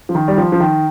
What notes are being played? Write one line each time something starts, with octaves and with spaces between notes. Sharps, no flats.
F3
D#3
G3
F3
F3
D#3